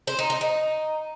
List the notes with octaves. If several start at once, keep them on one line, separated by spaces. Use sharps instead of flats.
C5
D#4
D#4
D#4